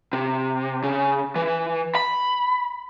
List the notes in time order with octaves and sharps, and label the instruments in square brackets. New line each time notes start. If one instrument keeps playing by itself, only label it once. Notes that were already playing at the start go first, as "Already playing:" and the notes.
[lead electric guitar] C3
C#3
E3
B5